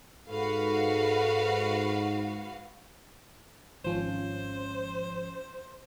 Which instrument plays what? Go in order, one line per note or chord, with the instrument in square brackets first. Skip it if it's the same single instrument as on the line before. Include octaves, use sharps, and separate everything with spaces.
[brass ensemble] G#2 [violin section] F#4 B4 F5 [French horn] A4
[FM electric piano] G#1 F3 C#4 [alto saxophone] C5